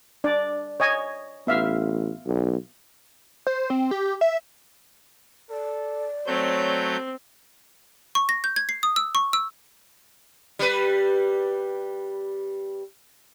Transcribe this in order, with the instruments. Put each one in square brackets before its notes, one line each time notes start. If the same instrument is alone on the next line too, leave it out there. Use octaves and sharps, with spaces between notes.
[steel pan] D4 D5
C#5 D#5 G#5
[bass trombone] A1 [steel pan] B3 E5 F5
[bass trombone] B1
[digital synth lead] C5
C4
G4
E5
[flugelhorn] A4 [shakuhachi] D5
[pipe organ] F#3 A3 G6 [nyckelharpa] C4 [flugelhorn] C#5
[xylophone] C#6
A#6
G6
G#6
C7
D#6
E6
C#6
E6
[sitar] G3 B4